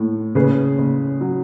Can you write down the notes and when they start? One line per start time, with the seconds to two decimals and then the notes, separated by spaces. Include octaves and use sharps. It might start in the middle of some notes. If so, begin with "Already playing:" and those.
Already playing: A2
0.35 C#3 G#4 B4
0.78 C#3
1.21 F#3